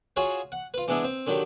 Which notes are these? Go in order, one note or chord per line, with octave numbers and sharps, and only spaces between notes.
F4 F#4 G#4 C#5 F#5
F#5
F4 B4
E3 G#3 B3 D4 E4
C4
D3 D#3 F#3 G4